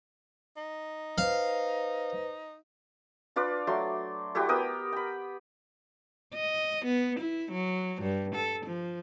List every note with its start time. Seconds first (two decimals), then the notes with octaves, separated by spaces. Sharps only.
0.57 D#4
1.18 B4 C5 F5
3.36 D4 F4 B4 D5
3.67 F#3 A3 C6
4.35 A3 E4 F#4 G4
4.49 B3 A#4 G5 D#6
4.92 G5 B5
6.34 D#5
6.85 B3
7.19 E4
7.52 F#3
8.02 G2
8.35 A4
8.66 F3